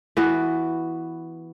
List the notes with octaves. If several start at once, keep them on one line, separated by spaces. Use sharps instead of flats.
E3 B3 F#4